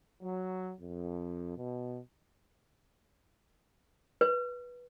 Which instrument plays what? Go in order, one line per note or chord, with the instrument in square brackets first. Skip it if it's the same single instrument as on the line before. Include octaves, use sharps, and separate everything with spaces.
[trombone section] F#3
F2
B2
[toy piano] B4